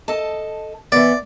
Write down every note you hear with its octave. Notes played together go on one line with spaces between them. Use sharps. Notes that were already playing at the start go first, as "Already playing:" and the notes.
A4 D#5 A5
E3 B3 D5